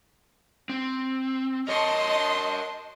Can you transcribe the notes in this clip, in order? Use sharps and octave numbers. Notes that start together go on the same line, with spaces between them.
C4
A#4 C#5 D#5 A5 C6